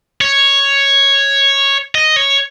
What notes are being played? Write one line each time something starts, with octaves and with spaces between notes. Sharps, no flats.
C#5
D#5
C#5